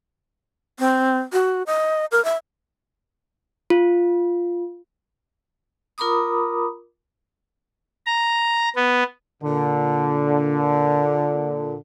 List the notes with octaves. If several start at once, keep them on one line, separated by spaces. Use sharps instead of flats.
C4
F#4
D#5
A#4
E5
F4
F4 A#4 A#5 B5 D6 D#6
A#5
B3
A#2 D3